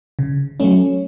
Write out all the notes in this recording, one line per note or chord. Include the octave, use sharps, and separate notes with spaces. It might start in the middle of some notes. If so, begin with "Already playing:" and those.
C#3
F#3 A3 C#4